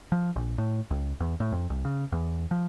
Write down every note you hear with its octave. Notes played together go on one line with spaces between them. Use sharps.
F3
A#1
A2
C#2
E2
A2
F2
C2
C#3
E2
F3